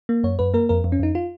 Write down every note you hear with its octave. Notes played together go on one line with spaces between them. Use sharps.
A#3
F#2 C#5
F#2 B4
A#3 A#4
F2 A#4
F2
C#4
F2 D#4
F4